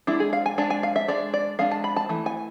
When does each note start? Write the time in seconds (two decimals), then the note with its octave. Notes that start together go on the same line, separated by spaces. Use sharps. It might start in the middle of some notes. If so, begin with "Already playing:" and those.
0.07 G#3 D4 E4
0.20 G#4
0.33 F5
0.46 G#5
0.58 G#3 D4 A5
0.70 G#5
0.83 F5
0.96 E5
1.08 G#3 D4 D5
1.34 D5
1.59 G#3 D4 F5
1.71 A5
1.84 B5
1.96 A5
2.09 E3 A3
2.26 G#5